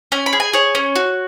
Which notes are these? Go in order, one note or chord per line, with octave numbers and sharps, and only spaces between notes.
C#4 G#5
B5
G#4
G#5
G#4 C#5
C#4
F#4